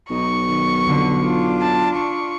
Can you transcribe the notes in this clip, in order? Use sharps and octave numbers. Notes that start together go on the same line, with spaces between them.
B1 D#4 C#6
D#3
F2 D3
D4 F4
A5
C#6